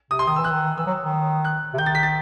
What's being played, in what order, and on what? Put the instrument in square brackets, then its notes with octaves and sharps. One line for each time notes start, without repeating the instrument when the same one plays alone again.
[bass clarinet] C3 [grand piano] D#6
[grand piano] C6
[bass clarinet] D#3 [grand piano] D#6
[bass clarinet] E3 [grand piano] E6
[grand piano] F#6
[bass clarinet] D#3
[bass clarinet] E3 [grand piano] E6
[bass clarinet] F#3
D#3
[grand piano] F#6
[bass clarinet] C3
[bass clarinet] D#3 [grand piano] G6
[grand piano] A6
B6
A6